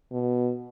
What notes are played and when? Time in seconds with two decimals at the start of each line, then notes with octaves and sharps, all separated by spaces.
0.11 B2